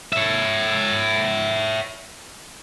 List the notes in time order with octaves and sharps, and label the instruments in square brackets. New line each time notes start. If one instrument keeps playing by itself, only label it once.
[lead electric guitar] C#5 E5